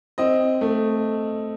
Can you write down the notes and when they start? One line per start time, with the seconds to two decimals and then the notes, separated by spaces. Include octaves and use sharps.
0.18 C4 D#5
0.61 A3